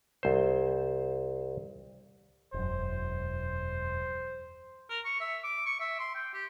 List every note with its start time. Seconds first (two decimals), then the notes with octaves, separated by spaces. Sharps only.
0.23 C2 C5
2.54 E1 F#2 C5
4.90 A#4
5.05 C#6
5.20 E5
5.44 D6
5.66 C#6
5.80 E5
6.00 C6
6.15 G5
6.34 G4